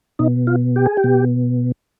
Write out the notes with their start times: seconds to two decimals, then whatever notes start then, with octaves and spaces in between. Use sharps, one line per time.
0.19 B2 D#4
0.47 F4
0.76 G4
0.86 G#4
0.97 G4
1.04 B2